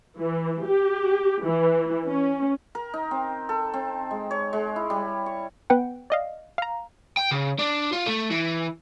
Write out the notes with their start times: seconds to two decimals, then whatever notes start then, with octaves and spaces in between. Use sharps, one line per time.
0.19 E3
0.64 G4
1.43 E3
2.06 C#4
2.75 A#4
2.94 D#4
3.11 C4
3.49 A4
3.74 C4
4.11 G#3
4.31 C#5
4.53 G#3
4.76 E4
4.90 G3
5.26 C#6
5.70 B3 B4 F#5 G5
6.10 D5 D#5 F5
6.58 F5 A#5
7.17 G5
7.31 C#3
7.59 D4
7.92 F4
8.06 A3
8.30 E3